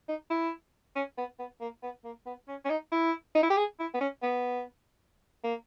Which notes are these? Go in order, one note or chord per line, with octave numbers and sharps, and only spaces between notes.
D#4
E4
C#4
B3
B3
A#3
B3
A#3
B3
C#4
C#4
D#4
E4
D#4
E4
G4
G#4
E4
B3
C#4
B3
A#3